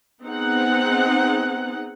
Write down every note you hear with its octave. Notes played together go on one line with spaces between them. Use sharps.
B3 C4 D#4 G#4 F#5